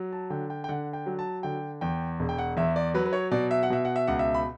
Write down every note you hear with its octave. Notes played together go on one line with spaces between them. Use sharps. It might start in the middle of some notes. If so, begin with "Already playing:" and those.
Already playing: F#3
A5
D3 G5
G5
G5
D3 F#5
G5
F#3
A5
D3 G5
E2 G5
E1
G5
F#5
E2 E5
D5
F#3 B4
B4
C#5
B2 D5
E5
F#5
B2 E5
F#5
E5
C#2 F#5
E5
B5